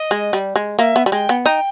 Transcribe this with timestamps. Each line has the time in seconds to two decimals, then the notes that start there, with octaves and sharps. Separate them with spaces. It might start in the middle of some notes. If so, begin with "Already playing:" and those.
Already playing: D#5
0.11 G#3
0.33 G3
0.56 G#3
0.79 A#3 E5
0.96 B3
1.06 G3
1.12 G#3 G5
1.29 B3
1.46 D#4 G5